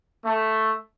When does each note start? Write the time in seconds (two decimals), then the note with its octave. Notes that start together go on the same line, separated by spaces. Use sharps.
0.24 A3